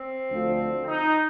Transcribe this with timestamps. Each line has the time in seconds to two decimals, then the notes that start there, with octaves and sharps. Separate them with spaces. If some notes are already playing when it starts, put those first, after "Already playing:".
Already playing: C4
0.29 D2 D3 F3
0.86 D#4